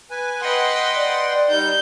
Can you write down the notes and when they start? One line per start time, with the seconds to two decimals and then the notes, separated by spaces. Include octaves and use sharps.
0.11 B4 G#5
0.42 B4 D#5 F#5 G5 C6
0.96 D5
1.50 G3 D#4 G6